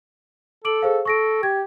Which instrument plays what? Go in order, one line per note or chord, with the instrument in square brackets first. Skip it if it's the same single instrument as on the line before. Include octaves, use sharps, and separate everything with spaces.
[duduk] A4 [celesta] D6 D7 F#7
[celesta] G#4 C5 F5
[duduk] A4 [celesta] C#6 A#6 D7
[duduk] G4 [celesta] G#6